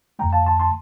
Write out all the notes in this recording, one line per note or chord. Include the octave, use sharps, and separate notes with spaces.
F2 D3 A3 G5 A#5
F5 A5
A5 C6
A5 C6